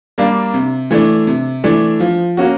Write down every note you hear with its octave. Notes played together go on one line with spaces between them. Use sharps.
G3 A#3 D4
C3
E3 A3 D4
C3
E3 A3 D4
F3
A#3 C#4 F#4